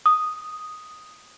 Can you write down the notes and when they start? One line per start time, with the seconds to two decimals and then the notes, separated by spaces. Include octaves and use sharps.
0.06 D#6